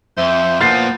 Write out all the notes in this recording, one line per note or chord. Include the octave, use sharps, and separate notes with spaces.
F2 C5 E5
F3 A#3 B3 F4 F6 A6 C7